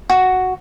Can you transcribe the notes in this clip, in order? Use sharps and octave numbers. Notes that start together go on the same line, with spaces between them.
F#4